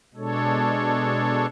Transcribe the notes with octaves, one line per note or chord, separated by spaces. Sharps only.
B2 G#3 D4 A4 C#5